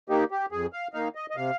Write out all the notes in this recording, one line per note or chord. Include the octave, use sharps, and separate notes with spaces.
D#3 A#3 D#4 G4
G4
F2 G#4
F5
D#3 A#3 D#4 F5
D#5
D#5
C3 F5